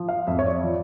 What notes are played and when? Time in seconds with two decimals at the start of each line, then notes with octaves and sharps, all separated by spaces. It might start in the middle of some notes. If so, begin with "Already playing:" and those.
Already playing: F3
0.09 F5
0.27 F2 E5
0.39 C#5
0.46 D5
0.63 F3